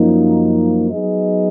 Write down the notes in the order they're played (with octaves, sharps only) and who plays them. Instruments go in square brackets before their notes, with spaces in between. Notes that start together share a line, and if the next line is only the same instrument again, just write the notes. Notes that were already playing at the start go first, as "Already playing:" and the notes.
Already playing: [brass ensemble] F#2 F3 A#3 D#4
F#3 B3 D#4 G#4 D#5